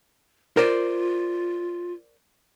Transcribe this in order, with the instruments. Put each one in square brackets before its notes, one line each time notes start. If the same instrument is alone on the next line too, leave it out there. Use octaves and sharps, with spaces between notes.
[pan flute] F4 [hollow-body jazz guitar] A#4 C5 D5